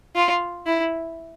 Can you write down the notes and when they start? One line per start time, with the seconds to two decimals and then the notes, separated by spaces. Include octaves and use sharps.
0.15 F4
0.66 E4